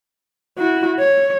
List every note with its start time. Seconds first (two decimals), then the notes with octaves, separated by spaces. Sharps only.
0.58 E4 F#4
0.99 C#5